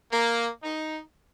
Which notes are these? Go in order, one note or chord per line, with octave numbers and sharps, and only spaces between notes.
A#3
D#4